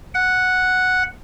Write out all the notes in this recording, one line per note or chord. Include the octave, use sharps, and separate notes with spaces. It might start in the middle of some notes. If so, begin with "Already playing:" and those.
F#5